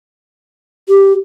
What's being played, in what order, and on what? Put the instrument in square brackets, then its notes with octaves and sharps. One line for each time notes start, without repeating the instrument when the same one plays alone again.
[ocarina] G4